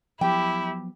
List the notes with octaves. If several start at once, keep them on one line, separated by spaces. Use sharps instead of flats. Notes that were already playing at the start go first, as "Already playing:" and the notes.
F3 F#3 B3 E4 G4 G5